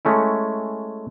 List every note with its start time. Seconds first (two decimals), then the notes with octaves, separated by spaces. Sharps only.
0.05 G#3 A3 C#4 E4